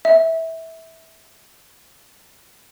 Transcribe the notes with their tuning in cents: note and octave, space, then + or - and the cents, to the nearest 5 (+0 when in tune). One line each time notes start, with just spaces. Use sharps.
E5 -20